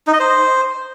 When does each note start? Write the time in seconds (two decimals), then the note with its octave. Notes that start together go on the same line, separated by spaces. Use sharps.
0.07 D#4
0.13 D#5
0.19 C5